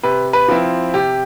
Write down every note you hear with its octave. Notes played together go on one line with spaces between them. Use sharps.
C3 B4
B4
F3 C4 E4
C3 G4